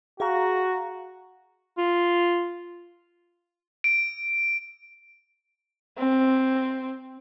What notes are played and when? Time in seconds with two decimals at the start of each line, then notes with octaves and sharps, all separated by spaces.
0.20 F#4 G#4 F5 A#5
1.77 F4
3.84 D7
5.98 C4